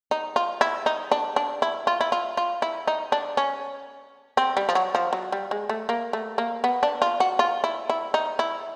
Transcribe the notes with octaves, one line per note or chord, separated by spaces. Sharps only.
D#4
F4
E4
D#4
D4
D4
E4
F4
E4
F4
F4
E4
D#4
D4
C#4
C4
G3
F3
F#3
F3
F#3
G3
G#3
A3
A#3
A3
A#3
B3
D4
F4
F#4
F4
E4
E4
D#4
E4